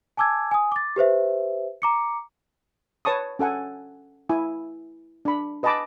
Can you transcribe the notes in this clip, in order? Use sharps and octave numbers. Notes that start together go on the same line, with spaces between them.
G#5 A5 D6 E6 G#6
G#5 D#6
D6 A6
G4 B4 C5 E5
A#5 D6 C#7
B4 C#5 A5 C#6 D#6
C#4 A4 F#5 G#5
E4 G#5
D4 B5
B4 D#5 G#5 A5 B5 D6